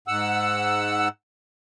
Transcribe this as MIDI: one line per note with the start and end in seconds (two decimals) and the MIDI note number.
0.08 1.08 44
0.08 1.08 78
0.08 1.08 88